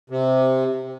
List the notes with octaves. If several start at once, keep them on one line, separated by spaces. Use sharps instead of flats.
C3